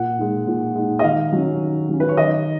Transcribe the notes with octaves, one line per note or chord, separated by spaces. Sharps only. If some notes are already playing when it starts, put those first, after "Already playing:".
Already playing: A#2 F#5
G#3 D#4
A#2
G#3 D#4
D#5
D#3 F5
F#3 C#4
D#3
F#3 C#4
B4
C#5
D#3 D#5